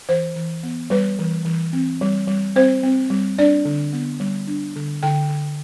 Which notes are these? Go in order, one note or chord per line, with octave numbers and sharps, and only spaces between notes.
E3 C5
E3
B3
G3 B4
E3
E3
C4
G3
G3
C4 C5
C4
G3
D4 D5
D3
B3
G3
D4
D3
D3 G5
D3